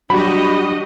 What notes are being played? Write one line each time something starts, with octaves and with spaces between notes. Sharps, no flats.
F#3 G3 D4 F#4 G4 D#5 B5